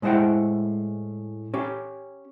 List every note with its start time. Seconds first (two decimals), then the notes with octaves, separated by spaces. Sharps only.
0.02 A2 G#3 E4 C5 F#5 G5
1.54 C#4 G4